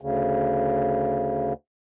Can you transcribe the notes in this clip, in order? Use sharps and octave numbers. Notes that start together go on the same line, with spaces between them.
D2 C#3